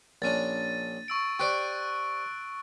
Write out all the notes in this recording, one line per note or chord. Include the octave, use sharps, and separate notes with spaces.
A#1 C#4 D4 A6 D#7
C#6 E6 D7
G4 C5 D5 C#6 F#6 D7